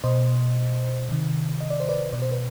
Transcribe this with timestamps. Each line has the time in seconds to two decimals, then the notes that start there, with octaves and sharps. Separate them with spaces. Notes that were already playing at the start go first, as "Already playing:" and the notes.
0.04 B2 C5 D#5
1.09 C3 D#3
1.60 D#5
1.70 D5
1.80 C5
1.89 B4 D5
2.12 B2 D5
2.22 C5
2.31 B4